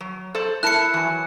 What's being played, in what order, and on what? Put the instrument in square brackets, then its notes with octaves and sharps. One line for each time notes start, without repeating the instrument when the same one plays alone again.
[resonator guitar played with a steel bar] F#3
A4 C5 D5
[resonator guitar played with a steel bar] E4 A#4 A5 [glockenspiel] F#6 C#7
[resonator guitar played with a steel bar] E3 F#3